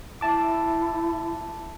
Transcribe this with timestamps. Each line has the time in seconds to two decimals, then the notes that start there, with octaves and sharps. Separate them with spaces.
0.21 E4 E5 A5 D6